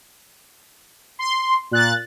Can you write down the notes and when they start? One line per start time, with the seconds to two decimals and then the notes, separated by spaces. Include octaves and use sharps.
1.19 C6
1.71 A#2 F#6 A6